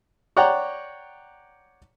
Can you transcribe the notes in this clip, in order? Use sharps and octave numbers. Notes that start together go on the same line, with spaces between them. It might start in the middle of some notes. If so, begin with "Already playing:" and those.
C#5 D5 F#5 G5 A#5